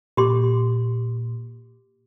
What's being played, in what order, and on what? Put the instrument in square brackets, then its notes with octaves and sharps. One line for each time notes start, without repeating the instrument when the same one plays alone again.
[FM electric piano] A#2 [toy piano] G4 C6 D6